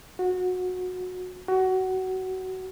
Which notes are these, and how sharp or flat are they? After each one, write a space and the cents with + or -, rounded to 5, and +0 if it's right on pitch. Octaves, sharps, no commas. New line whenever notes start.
F#4 -20
F#4 +20